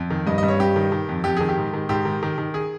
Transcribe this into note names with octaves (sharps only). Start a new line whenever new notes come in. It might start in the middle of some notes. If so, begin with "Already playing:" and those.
Already playing: F2
D#3
G2 D#5
D#5
G2
C#5
G2 G4
D#3
D#3
F2
F2 G4
D#3 G#4
G4
G#2
D#3
G#2 G4
D#3
D#3
D#3
G#4